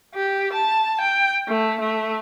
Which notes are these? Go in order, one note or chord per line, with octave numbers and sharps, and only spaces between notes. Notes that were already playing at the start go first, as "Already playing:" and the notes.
G4
A5
G5
A3
A3